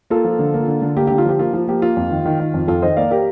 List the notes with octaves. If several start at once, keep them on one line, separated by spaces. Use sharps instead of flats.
A#3 F4 A4
F3
D3
A#3
D3
D3
A#3 G4
D3 G4
F4
F3 G4
A#3 F4
F3
A#3 G4
A#3 F4
F2
D#3
D#3
D#3
F2
F2 F4 A4
D#3 C5 D#5
A#3 D5 F5
G4 A#4